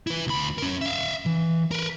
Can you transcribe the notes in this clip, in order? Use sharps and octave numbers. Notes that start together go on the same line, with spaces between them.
E4 B4
D2 B5
C#4 A#4
E5 F5
E3
A#4 B4